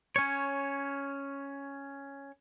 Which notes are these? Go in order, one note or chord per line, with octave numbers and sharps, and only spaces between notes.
C#4 C#5